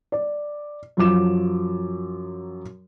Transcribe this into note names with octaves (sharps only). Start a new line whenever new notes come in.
D5
F#2 F3 F#3 D6 E7